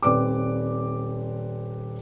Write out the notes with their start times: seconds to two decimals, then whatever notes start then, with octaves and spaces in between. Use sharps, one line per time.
0.03 D#1 C4 B4 D5 D6